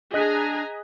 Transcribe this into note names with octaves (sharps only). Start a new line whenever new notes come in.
D4 G#4 D#5 G#5 A#5 F#6 B6